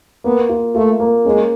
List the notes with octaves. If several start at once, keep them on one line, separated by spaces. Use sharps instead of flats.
A#3 B3
F4
A3 F4
A#3
G#3 C#4